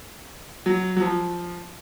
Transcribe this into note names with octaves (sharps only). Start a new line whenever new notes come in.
F#3
F#3
F3